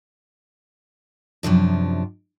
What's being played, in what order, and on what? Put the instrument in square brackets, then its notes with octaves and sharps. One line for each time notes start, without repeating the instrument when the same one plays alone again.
[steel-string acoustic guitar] F#2 C3 F3 D4